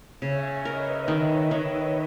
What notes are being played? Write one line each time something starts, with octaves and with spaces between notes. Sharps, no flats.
C#3 C#5 E5
A#4 B4 D#5
D#3
D#3